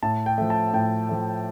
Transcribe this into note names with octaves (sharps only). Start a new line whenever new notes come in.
A2 A5
G5
F3 A3
A5
A2 G5
F3 A3